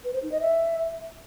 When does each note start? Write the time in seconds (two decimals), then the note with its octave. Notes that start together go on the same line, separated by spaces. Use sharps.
0.04 B4
0.13 C5
0.22 D#4
0.32 D#5
0.41 E5